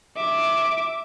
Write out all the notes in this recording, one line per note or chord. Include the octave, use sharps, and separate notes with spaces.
E5 D6